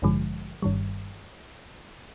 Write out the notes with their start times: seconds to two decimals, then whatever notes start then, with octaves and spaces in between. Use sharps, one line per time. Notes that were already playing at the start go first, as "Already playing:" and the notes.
0.02 A1 G2 D3 F3 G#3
0.62 G1 G2 D#3 G3